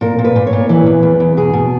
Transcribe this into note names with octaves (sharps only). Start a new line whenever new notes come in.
A#2 A#4
A#2
B4
A#2
C#5
A#2
E3 B4
E2
E2
E2
B2 G#4
B2